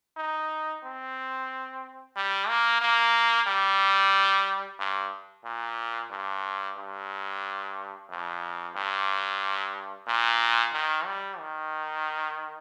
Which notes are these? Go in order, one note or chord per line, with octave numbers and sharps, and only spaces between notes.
D#4
C4
G3
A#3
A#3
G3
G2
A#2
G2
G2
F2
G2
A#2
D#3
G3
D#3